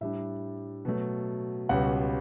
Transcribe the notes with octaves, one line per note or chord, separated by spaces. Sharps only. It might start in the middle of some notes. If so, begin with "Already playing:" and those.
A2 G3 D4 E5
B2 F#3 A3
C#2 B2 G3 C#4 F#5